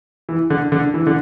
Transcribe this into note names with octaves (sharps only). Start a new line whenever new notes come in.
E3
D3
D3
E3
D3